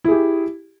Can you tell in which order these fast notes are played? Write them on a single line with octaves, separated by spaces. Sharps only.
E4 G#4 G4